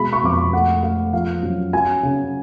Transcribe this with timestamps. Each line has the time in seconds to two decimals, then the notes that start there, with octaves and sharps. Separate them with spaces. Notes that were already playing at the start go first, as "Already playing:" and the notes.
Already playing: B2 G#3 B5
0.13 C#6
0.23 F2 D6
0.33 C#6
0.53 A3 F#5
0.83 A3 F5
1.13 F3 F5
1.43 F#2
1.73 F#3 G#5
2.03 C#3